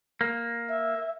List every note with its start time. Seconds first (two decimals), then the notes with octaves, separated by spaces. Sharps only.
0.21 A#3
0.69 E5